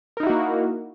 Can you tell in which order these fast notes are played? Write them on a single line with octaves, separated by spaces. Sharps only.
A#4 D#4 E4 F#4 A#3